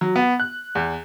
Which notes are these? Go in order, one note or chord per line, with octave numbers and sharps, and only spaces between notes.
F#3
B3
F#6
E2